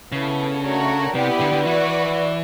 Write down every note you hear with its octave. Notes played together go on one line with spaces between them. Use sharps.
C#3 B3 E4 A4
A3 D4 F#4 A#4 C#5
C3 B3 E4 G4 B4 D5
D3
D3
E3 F#4 B4 D5